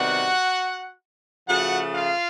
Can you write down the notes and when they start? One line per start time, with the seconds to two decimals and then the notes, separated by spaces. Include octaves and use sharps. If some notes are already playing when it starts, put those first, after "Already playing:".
Already playing: C3 D#3 G3 B3 F#4 F#5
1.47 C#3 F3 A3 F#4 F#5
1.93 F4 F5